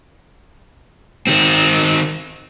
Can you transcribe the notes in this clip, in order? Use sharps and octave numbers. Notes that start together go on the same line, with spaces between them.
D#3 C4